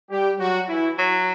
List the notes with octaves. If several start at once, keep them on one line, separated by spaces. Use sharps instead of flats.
G3 G4
F#3 F#4
E3 E4
F#3